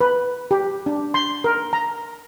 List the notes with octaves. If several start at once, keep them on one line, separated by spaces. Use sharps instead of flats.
B4
G4
D4
C6
A#4
A#5